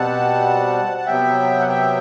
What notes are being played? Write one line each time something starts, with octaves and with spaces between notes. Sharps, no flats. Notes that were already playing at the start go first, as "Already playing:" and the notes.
Already playing: B2 G3 C4 F#5 A5
A5
C3 F#3 B3 E5 G5
F#5
E5 G5